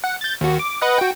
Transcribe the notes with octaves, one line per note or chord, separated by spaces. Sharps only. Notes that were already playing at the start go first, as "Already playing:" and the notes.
F#5
G6 A6
D#2 F#4
D6
B4 D#5 F#5
F#4 G5